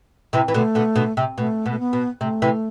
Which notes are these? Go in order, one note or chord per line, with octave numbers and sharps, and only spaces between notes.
C3 E3
E3
B2 D3 A3
B2 D3
B2 D3
C3
B2 A3
B2
A3
B3
B2
C3 A3
C3 E3